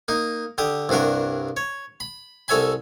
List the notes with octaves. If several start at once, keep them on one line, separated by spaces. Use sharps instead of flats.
A#3 D#4
D3 G4 D#6
C2 G2 D4 F#4 A#4
C#5
B5
C2 A4 C#5 E5 G#5 B5